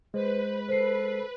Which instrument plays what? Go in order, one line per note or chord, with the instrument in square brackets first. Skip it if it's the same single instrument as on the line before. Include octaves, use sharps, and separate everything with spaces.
[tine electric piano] G#3 [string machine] B4 [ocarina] C5
[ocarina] A4 [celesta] C5 C7